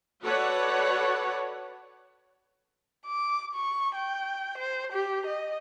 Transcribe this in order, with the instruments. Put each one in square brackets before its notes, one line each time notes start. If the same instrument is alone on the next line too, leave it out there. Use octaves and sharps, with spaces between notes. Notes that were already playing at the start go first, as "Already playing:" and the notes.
[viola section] F#4 A4 B4 C#5 D5 F#5
[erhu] D6
C#6
G5
C5
G4
D#5